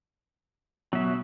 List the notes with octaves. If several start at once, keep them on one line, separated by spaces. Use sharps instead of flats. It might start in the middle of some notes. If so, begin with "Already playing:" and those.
B2 F#3 E5